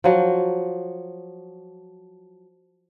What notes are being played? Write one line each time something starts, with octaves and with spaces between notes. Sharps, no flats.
F3 F#3